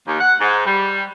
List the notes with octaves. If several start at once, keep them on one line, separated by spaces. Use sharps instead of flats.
D#2
F#5
G#2
G3